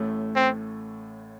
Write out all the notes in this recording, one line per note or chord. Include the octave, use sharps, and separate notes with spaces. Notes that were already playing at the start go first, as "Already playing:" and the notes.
Already playing: A1 A2 A3
C4